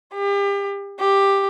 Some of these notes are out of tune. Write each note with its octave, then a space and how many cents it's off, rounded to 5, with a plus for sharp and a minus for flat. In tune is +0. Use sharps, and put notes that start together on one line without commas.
G4 +35
G4 +10